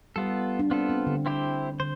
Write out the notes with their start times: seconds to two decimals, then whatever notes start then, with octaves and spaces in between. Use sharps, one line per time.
0.16 G3 B3 F4 A4
0.59 D4
0.70 B3 C4 F4 A4
0.89 C4
1.07 D3
1.26 C4 E4 G4 C5
1.80 D3 C5